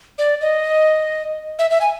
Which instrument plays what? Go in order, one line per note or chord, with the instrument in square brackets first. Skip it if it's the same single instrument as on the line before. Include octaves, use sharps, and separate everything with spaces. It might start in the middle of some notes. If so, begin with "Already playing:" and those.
[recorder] D5
D#5
E5
E5
G#5